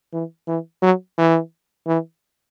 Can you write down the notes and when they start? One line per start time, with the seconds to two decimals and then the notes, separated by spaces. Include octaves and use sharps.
0.13 E3
0.47 E3
0.82 F#3
1.18 E3
1.87 E3